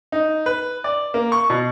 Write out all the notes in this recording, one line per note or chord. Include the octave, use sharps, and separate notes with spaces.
D#4
B4
D5
A#3
C#6
B2